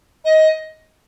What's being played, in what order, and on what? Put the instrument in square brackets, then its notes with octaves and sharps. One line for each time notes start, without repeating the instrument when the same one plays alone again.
[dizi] D#5